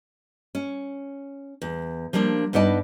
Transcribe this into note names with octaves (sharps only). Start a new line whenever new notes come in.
C#4
E2
F3 G3 A#3 D4
G2 B3 D#4 D5 A5